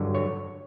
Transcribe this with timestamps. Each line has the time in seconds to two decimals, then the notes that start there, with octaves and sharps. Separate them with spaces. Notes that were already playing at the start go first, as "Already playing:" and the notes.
Already playing: G2 D3 F#3
0.15 C#5